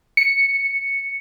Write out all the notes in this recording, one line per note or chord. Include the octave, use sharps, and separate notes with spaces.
C#7